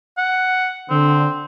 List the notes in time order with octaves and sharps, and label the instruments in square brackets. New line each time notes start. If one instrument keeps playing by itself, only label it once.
[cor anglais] F#5
[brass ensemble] D3 [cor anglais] C4